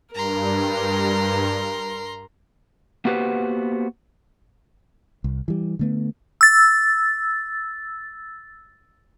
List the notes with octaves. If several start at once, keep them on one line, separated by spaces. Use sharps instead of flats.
G2 A#4 A#5 C6
A#3 B3 F#4 G4 B4 C5
C2
E3 G3
D3 A3 B3
E6 A6